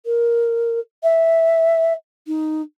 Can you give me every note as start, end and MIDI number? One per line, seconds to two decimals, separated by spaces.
0.05 0.79 70
1.03 1.93 76
2.27 2.61 63